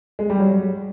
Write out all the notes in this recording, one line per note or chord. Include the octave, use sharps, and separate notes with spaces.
G#3
G3
F#3